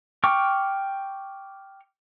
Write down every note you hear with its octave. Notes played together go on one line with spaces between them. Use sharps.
G5 C#6 D6 F6